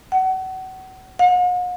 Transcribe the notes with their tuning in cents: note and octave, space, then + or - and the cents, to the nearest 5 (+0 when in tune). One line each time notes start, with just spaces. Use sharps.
F#5 +30
F#5 -45